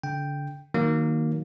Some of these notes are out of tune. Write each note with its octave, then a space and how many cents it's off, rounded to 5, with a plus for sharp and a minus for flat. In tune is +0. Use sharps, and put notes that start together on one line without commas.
D3 -30 G5 +0
D#3 +0 F#3 +0 A#3 +0